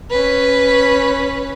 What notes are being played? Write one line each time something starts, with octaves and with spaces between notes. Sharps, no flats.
C#4 B4